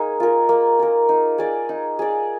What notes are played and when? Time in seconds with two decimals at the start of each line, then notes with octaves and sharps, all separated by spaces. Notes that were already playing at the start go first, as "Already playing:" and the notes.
Already playing: A#3 D#4 G#4
0.20 F4 A#4
0.49 A#3
0.79 F4 A#4
1.09 D#4
1.38 G#4 D5
1.69 D#4
1.99 G#4 D5